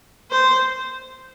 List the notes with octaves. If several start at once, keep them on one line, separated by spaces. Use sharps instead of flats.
C5